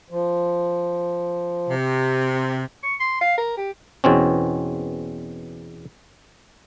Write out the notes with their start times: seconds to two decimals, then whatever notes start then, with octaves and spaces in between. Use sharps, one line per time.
0.10 F3
1.69 C3
2.83 C#6
3.00 C6
3.21 F5
3.38 A#4
3.57 G4
4.04 E2 B2 C4 C#4